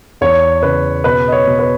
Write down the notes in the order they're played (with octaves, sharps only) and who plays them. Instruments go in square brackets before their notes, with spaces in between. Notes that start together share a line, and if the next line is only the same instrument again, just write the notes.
[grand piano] E2 C#5
C#3 B4
B2 B4
D#5
C#5
B2
B4